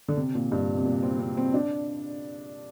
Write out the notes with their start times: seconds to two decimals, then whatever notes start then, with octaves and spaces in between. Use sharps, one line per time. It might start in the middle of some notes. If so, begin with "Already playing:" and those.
0.08 D3
0.17 C3
0.35 A#2
0.52 G2
0.78 C3
0.85 A#2
1.03 C4
1.19 C4
1.37 C4
1.54 D4